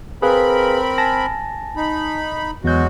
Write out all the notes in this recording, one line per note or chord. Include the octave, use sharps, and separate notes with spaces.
C4 G#4 A#4 B4 F5 B5
G#5 A5 A#6
D#4 B5
E2 F#3 G#3 F#4 G6